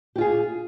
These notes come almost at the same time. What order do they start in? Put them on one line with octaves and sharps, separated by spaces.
G4 F4 G#4